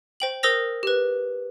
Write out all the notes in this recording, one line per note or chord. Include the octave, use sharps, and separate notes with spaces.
C5 G5 F#7
A#4 C5 D#6 E6 A#6 F7
G4 B4